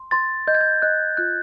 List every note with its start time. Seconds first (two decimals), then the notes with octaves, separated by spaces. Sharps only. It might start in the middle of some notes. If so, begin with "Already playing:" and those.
Already playing: C6
0.11 C6 A6
0.48 D#5 G6
0.54 G#6
0.61 G6
0.82 D#5 F#6
1.17 F4 F#6